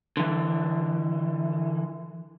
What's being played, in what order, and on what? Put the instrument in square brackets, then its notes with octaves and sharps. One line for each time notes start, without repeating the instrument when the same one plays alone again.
[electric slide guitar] D3 E3